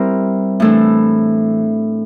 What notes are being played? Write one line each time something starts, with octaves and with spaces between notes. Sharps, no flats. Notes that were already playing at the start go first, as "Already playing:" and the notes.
Already playing: G3 C4 E4 A#4
A2 E3 A3 D4 A4